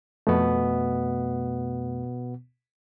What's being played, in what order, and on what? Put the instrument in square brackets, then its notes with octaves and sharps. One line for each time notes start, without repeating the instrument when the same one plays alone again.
[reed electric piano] F2 A3 [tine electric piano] B2 B3